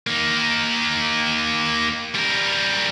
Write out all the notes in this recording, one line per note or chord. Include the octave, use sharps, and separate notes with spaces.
A#3 D#4
G3 A#4